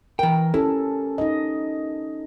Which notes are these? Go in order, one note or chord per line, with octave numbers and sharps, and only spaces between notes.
E3 A#4 G5
C#4 E4 G4 A4
D#4 D#5